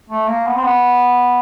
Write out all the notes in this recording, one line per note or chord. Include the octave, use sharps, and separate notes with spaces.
A3
A#3
B3
C4
B3